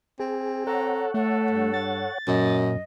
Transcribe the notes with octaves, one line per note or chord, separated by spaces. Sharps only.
C4 G#4
A4 C#5 F#5 A#5
A3 A4
G2
A6
F#2 A#2 D#5